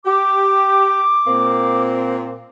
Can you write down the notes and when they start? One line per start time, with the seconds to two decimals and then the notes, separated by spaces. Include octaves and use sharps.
0.05 G4 D6
1.26 A#2 A#3 C4